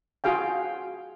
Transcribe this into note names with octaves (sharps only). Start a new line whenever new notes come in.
F4 F#4 G#4 F5 G5